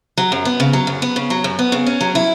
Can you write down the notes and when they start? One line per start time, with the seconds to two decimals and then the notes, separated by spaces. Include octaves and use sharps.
0.17 F#3
0.32 F#2
0.45 B3
0.60 C#3
0.73 F#3
0.87 F#2
1.02 B3
1.16 C#3
1.30 F#3
1.44 F#2
1.59 B3
1.72 C#3
1.86 C#4
2.01 F#3
2.15 E4